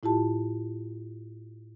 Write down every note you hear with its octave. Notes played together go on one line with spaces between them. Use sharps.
A2 E4 F4 G4 A5